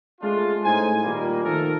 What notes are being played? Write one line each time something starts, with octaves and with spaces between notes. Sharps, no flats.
G#3 A3 C#4 D4 F4
A2 D#4 C5 G#5
A#2 D#3 G3 A#3
D#3 F3 A3 A4 A#4